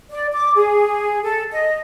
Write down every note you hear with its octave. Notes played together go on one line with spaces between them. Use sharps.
D5
D6
G#4
A4
D#5